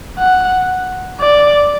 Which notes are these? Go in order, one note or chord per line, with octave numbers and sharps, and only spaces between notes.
F#5
D5